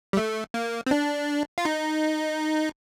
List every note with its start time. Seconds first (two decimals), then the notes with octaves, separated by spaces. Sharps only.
0.13 G3
0.17 A3
0.54 A#3
0.86 C4
0.91 D4
1.58 F4
1.65 D#4